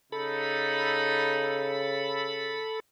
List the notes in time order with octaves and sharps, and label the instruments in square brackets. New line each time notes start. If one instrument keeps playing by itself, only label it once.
[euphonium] C#3 [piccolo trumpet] D#4 [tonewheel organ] A4 B5